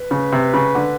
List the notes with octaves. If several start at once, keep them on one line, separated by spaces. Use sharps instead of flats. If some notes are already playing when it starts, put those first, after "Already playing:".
Already playing: B4
C#3
C3
C#3
D3